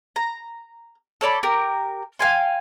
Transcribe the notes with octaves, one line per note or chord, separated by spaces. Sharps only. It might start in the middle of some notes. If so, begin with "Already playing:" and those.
A#5
A4 C#5 D5 B5
G4 A#4
F5 G5 G#5 C6